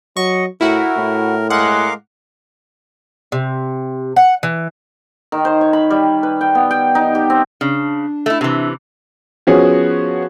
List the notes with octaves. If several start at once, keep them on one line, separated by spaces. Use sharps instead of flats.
F#3 D#5 C#6
A2 E4 F#4 A#4
A2
G#3 A#4 F5 F#5 D6
C3
F#5
E3
D#3
C5
C#5
B5
G3
B4
G5
B3
G5
D#4
G4
C4
C#3 D4
A3 E4
C3 E3
F3 B3 C#4 F#4 G#4